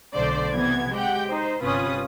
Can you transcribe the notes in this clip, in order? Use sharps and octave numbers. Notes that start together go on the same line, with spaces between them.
B1 D3 A3 C5 D5
C3 E3 B3 G#6
G#3 G4 F#5 G5
D#4 C5
G1 C3 C#4 F4 B4 D#6